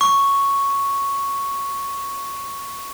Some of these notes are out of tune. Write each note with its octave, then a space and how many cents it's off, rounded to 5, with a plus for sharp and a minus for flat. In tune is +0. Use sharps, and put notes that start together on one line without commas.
C#6 +0